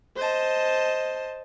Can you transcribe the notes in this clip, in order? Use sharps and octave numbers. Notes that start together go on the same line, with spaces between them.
C5 D#5 A5